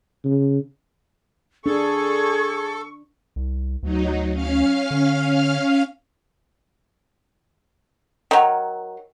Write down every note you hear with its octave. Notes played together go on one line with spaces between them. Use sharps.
C#3
D4 G#4 A4 C#6
C2
D2 F#3 D#4
C#4 F5 F6
D3
D#3 F#3